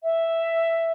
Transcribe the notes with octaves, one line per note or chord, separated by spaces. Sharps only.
E5